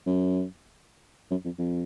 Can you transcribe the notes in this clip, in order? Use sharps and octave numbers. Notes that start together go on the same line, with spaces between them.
F#2
F#2
F2
F2